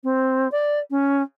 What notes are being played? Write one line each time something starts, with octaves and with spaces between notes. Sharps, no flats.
C4
D5
C#4